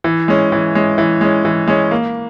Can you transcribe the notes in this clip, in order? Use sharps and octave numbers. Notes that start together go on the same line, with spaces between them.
E3
G#3 C#4
E3
G#3 C#4
E3
G#3 C#4
E3
G#3 C#4
A#3